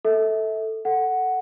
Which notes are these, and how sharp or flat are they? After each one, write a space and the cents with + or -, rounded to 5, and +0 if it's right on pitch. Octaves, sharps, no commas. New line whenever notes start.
A4 +0 E5 -30
A4 +0 F#5 +0